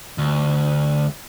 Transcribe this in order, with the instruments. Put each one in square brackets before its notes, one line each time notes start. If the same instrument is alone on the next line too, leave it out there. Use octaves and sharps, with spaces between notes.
[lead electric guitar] D2